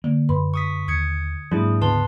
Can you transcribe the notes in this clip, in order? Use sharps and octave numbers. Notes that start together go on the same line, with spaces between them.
D3 A#3
F#2 B4 B5 C6
C#6 D#6 B6
D#2 D#6 G#6 C#7
G#2 F#3 G#3 A#3 D4 E4 G#4
D2 C#3 B3 B4 A5 C6